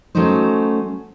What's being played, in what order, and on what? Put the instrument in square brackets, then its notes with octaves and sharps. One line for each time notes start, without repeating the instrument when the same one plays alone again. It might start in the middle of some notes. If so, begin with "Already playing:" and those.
[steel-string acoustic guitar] F#3 A3 C#4 D#4 C5